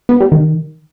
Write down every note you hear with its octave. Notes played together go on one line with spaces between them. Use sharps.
B3
G3
D#3